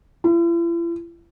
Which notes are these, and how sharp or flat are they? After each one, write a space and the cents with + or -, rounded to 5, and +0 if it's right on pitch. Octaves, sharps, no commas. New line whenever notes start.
E4 +45